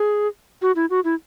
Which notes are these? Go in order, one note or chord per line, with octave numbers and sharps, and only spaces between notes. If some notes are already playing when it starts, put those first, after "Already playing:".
Already playing: G#4
F#4
E4
F#4
E4